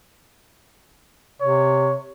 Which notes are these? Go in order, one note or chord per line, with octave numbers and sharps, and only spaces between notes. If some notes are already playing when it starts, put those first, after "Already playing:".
C3 C#5